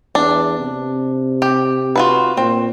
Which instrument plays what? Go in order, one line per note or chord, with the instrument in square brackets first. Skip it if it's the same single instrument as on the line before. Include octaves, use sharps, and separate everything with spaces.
[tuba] E2 [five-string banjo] D4
[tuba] C3
[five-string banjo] G4
F4 F#4 B4
[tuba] A#2 [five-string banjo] C4